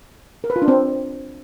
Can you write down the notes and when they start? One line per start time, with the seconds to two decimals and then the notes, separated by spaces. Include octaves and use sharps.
0.44 A#4
0.50 B4
0.56 F4
0.62 D4
0.68 C4